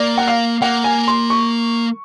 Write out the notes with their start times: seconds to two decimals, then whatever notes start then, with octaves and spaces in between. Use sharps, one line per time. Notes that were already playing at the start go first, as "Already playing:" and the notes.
Already playing: A#3 D5
0.18 F#5
0.27 F5
0.62 A#3 F#5
0.84 G#5
1.08 C6
1.30 C#6